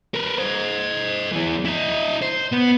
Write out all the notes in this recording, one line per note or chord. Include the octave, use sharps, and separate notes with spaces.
A#4 B4
C5 D#5
E3 G#4
E4 D#5
C5
B3